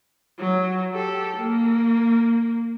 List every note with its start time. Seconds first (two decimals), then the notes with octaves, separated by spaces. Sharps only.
0.39 F#3
0.94 G4 A4
1.36 A#3